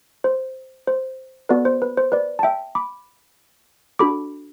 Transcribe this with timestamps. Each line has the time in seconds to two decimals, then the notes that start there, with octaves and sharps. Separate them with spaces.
0.24 C5
0.87 C5
1.49 B3 F#4 A4 B4 D5
1.65 C5
1.82 B4
1.97 C5
2.12 B4 D5
2.39 A5
2.43 E5 G5
2.75 B5 D6
3.99 D4 F#4 A4 B5 D6